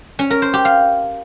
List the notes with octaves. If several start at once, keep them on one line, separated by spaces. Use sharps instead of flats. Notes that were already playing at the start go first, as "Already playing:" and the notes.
C#4
A#4
C5
G4
F5